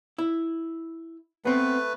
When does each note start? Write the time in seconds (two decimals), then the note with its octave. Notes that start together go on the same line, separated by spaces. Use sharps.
0.18 E4
1.45 A3 B3 C4 B4